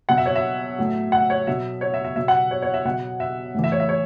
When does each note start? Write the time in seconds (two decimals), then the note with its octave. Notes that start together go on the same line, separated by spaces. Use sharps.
0.09 B2 F#3 F#5
0.18 E5
0.26 C#5
0.36 E5
0.78 A2 F#3
1.12 F#5
1.30 C#5
1.47 B2 F#3 E5
1.81 C#5
1.94 E5
2.04 E5
2.16 B2 F#3 E5
2.28 F#5
2.51 C#5
2.62 C#5
2.74 E5
2.85 B2 F#3 F#5
3.20 E5
3.54 A2 E3
3.64 E5
3.72 C#5
3.80 E5
3.89 C#5